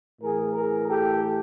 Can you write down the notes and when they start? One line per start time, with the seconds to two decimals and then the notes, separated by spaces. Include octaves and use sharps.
0.21 A2 E3 G#4 A#4
0.55 G#4 A#4
0.88 G4 A4